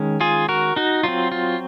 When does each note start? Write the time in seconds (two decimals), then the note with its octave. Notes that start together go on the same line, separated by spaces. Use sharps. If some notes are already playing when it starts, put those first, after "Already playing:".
Already playing: D#3 G#3 C#4
0.21 F4 G#4
0.49 F#4 A#4
0.76 D#4 F#4
1.03 F#3 C4 F4
1.32 F4